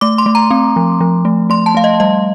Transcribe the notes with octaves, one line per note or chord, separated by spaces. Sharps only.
A3 D6
C6
A3
A#5
C4
F3
F3
A3
A3 C6
A5
A3 F5
D#5
G3 D#5